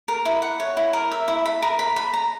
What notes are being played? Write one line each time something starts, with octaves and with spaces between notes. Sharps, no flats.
A#4
E4
F#5
C#5
E4
A#4
E5
E4
B5
A#4
B5
B5
A#5